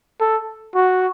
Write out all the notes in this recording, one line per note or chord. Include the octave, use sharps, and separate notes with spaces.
A4
F#4